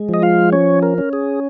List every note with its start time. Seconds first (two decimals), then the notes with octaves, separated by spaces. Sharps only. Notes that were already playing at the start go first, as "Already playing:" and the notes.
Already playing: G#3
0.09 F3 D#5
0.22 F4 F5
0.52 C#4 C#5
0.82 A#4
0.98 C#4
1.13 G#4